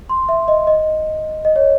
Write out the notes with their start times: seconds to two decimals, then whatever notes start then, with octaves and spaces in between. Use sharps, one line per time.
0.09 C6
0.29 E5
0.48 D#5
0.67 D#5
1.45 D#5
1.56 C#5